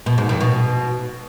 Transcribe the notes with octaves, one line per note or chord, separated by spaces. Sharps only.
B2
G#2
F2
B2